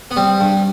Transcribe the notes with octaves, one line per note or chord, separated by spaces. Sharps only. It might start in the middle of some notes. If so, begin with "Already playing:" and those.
B3
G3 C4
G2